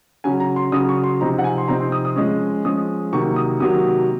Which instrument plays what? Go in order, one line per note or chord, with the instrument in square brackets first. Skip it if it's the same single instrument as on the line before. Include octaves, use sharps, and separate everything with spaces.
[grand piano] C#3 F#3 C#4 G#5
A#5
C6
C#3 F#3 C#4 D#6
C#6
C6
C3 F3 C4 D#4 A#5
F#5
G#5
C6
C3 F3 C4 D#4 A#5
C6
D#6
D#6
F3 G#3 C#4
F3 G#3 C#4 D#6
C3 D#3 F#3 A#3 C#6
D#6
C3 D#3 F#3 A#3 D#6